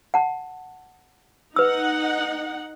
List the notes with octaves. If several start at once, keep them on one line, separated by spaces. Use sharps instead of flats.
F#5 A5
D#4 B4 F#5 E6